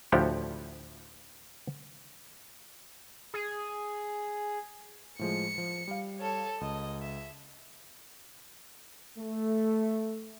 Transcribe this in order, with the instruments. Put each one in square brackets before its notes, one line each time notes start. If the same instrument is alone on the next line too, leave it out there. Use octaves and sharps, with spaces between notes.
[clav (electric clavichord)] D2 A2 F3 E4 G4 F#5
[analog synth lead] G#4
[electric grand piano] A2 F3 G#3 [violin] C#7
[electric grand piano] F3
G3 F5
[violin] A4 C#5
[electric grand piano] C#2 [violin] D#5
[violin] E5
[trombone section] A3